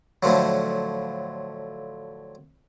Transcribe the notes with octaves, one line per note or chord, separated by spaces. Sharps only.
A2 D3 F3 F#3